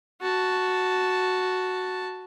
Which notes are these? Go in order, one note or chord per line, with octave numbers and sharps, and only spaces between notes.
F#4 A5